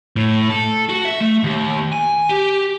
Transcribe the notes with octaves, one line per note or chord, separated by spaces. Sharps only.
A2
A4
F#4
E5
A3
D#2
G#5
G4